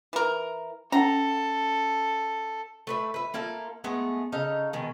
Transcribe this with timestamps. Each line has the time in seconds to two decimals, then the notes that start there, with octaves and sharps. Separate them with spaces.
0.13 E3 A#4
0.92 C#4 A4 F#5 A#5
2.87 A3 B4 E5
3.14 B4 E5
3.34 A#3 E4 F4 A4
3.84 G#3 A3 B3
4.32 C#3 D#4 A4 F5
4.73 B2 D#3 G#3